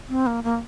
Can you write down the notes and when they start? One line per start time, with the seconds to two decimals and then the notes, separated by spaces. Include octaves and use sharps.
0.09 C4
0.27 A#3
0.44 A#3